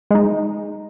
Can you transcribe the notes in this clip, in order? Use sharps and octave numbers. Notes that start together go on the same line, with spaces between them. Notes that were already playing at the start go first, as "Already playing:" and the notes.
G#3 D#4